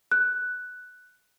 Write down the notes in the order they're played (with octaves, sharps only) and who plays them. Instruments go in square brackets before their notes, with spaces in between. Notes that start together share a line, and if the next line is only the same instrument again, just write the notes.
[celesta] F#6